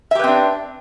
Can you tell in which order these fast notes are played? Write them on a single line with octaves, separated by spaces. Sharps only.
E5 G4 B4 C4 D4